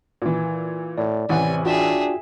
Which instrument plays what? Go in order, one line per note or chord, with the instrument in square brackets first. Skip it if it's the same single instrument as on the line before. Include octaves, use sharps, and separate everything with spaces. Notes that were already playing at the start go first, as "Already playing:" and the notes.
[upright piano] A#2 E3
[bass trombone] A2 [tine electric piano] D5
[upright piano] A1 E3 F#5 [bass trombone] C3 [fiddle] G#5
[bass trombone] D4 [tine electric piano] F4 F#4 G5 [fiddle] G#4 E5